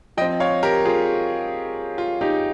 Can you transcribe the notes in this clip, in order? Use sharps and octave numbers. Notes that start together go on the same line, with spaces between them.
F3 C4 D#5 G5
C#5 F5
G4 A#4
F4 G#4
F4
D#4 G4